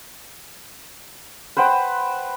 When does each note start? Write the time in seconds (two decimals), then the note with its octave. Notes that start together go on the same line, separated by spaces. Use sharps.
1.57 B4 C5 F#5 G5